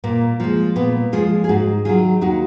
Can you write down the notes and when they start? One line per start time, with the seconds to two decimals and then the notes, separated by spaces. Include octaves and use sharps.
0.04 A#2 A#3
0.40 F3 G#3
0.76 A#2 B3
1.12 F3 G#3 F4 G#4
1.44 G#4
1.49 G#2 D#4 F#4
1.85 D#3 F#3 F4 G#4
2.21 D#2 D#4 F#4